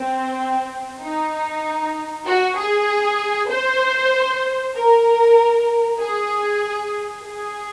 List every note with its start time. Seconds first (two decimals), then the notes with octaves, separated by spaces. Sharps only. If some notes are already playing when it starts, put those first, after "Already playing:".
Already playing: C4
1.01 D#4
2.26 F#4
2.56 G#4
3.49 C5
4.74 A#4
5.99 G#4
7.23 G#4